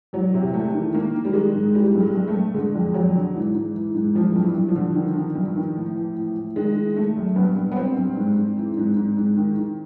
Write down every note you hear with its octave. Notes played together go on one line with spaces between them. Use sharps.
E2 F#3
C3
E2 A3
D#3
D#3 A#3
D#3
G3
D#3 G#3
G#2
E3 G3
G2
G#3
G2
A3
G2
D3 G#3
F2
F2 F#3
D3
G#2 E3
G#2
E3
G#2
G2 F3
G2
E3
G2
F3
D3
D#3
D#3
G2
D#3
A2
E3
A2
A2
D#3 G#3
D#3
D#3 A3
F#2
G2 B3
G2
B3
G2 C4
G2
G#2
G#2
E3
G#2
G#2
G#2
D#3
D#3